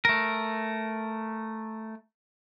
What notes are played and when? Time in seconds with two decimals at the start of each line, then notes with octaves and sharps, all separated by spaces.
0.05 A3 A#4